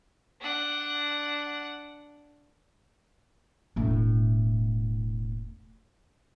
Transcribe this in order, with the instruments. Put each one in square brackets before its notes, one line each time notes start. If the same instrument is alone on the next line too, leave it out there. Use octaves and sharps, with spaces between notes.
[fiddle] D4 F#5
[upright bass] E1 A2